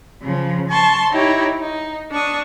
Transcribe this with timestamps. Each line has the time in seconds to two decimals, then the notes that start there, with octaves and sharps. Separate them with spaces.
0.23 C#3 F3
0.70 A5 C6 C#6
1.11 D#4 E4 G4 C#5
1.58 D#4
2.10 D4 C#6 D#6